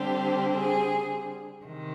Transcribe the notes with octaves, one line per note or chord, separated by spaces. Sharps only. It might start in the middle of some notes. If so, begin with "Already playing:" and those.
Already playing: D3 G3 C4 G4
G#4
C3 D#3